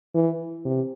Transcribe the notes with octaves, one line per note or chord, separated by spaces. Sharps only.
E3
C3